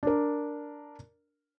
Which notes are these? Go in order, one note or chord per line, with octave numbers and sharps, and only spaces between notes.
D4 A#4